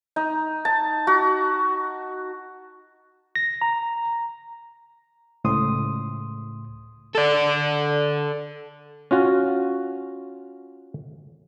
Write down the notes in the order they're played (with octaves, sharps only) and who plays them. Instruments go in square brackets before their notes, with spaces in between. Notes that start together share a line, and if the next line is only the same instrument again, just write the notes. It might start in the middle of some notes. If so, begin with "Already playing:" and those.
[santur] D#4
A5
F#4
[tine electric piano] A#6
A#5
[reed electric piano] C#2 A2 C6 D#6
[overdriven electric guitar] A4 D5
[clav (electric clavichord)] C#4 F4 F#4